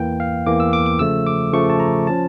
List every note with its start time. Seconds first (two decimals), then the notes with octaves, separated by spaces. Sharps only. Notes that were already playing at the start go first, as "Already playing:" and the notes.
Already playing: E2 E3 A#3 G5
0.20 F5
0.47 E2 E3 A#3 D6
0.60 E6
0.73 D6
0.86 D6
0.99 C#3 F3 A3 E6
1.27 D6
1.53 C#3 F3 A3 C#6
1.70 A5
1.80 A#5
2.07 F3 C#4 A5